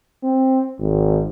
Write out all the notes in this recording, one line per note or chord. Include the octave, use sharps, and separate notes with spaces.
C4
G#1